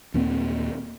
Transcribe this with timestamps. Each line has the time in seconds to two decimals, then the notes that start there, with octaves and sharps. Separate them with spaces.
0.14 D#2 A#2 A#3 C4